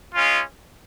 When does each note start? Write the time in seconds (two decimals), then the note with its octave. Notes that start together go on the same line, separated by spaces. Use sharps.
0.13 G#3 C#4 F4